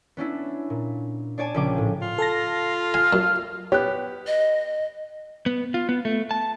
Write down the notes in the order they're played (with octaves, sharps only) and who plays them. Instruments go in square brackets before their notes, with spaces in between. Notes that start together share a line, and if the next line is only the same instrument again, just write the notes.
[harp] B3 C#4 D4 E4
A#2
D4 C#5 D5 G#5 A5
A#1 C#3 F3 C#4 G5 D6
A2
[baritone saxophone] F4
[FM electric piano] A4 A5 A#6
[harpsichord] G#5 [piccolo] F6
[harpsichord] F#2
[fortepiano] B3 G4 [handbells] C#5 F#6
[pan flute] D#5
[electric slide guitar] B3
F4
B3
A3
A5